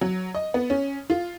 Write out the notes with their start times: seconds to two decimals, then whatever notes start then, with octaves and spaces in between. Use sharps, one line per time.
0.01 F#3
0.35 D#5
0.54 B3
0.70 C#4
1.10 F4